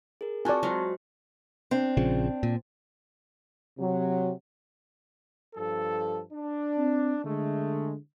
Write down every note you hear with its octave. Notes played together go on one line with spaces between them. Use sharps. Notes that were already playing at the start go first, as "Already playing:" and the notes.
G#4 A#4
C4 F4 F#4 D5 G#5 A5 C#6
F#3 G#3 F4 F#4 C5
C4 D4
A#1 C#3 F3
A#2
C3 F#3
G2 F3 A4
D4
C4
D3 G#3 A3